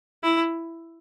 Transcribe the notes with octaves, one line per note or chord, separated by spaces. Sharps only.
E4